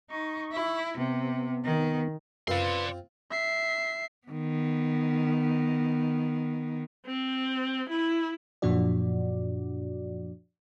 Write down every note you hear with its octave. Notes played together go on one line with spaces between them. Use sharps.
D#4 C#6
E4
C3 B3
D#3
F#2 C4 F4 B4 D5 C6
E5 C7
D#3 B3
C4
E4
F#2 A#2 F3 D4 F#4 D5